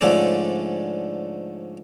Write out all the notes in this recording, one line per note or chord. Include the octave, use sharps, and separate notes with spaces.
G#2 D3 F3 A3 C#4 D4